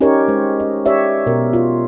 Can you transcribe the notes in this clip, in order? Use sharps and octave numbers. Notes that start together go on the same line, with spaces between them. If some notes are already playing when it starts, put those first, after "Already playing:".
C#4 D#4 G4 A#4 C#5
G#3 C5
D#5
G4 C#5 D5 E5
B2 A#4
F4